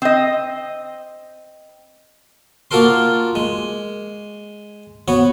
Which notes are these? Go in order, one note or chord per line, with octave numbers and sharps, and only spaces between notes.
C4 D#5
A#3 F4 F#4 A4 A#4 C6
G#3
B3 F#4 C#5